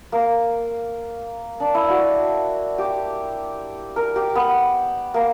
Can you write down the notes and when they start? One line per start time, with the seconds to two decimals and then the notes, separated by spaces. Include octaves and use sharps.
0.12 A#3
1.60 D4
1.74 E4
1.89 F#4
2.78 G4
3.96 A#4
4.16 G4
4.35 B3
5.14 A#3